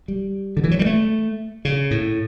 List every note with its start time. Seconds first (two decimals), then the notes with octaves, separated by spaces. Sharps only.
0.08 G3
0.57 D3
0.64 E3
0.71 F#3
0.79 G3
0.86 A3
1.65 C#3
1.91 A2